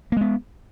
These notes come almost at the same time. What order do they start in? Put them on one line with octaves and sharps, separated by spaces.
A#3 G#3 B3